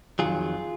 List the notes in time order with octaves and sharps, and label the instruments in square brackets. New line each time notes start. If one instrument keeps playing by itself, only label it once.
[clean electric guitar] F2 D#3 F#3 F4 G#4